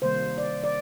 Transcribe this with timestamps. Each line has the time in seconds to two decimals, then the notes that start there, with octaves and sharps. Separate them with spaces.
0.02 C3 D#3 G3 A#3 C5
0.38 D5
0.64 D5